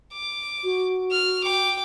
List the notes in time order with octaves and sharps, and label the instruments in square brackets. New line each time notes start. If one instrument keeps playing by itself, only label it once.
[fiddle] D6
[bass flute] F#4
[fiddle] F6
G5 D6